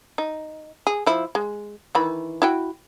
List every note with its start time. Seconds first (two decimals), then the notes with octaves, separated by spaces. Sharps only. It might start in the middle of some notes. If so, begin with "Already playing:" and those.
0.18 D#4
0.87 G#4
1.07 F3 E4
1.35 G#3
1.95 D#3 E3 B5
2.42 E4 F#4 G5